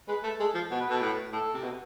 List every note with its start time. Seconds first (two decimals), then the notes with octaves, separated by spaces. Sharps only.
0.08 G#3 B4
0.23 A3
0.40 G#3 A4
0.54 F3
0.71 B2
0.80 B4
0.90 B2 A4
0.99 A2 B4
1.32 A2 A4
1.54 C3
1.63 B2